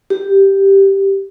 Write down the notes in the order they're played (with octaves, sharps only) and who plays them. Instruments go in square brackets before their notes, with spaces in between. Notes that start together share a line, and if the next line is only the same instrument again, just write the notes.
[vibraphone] G4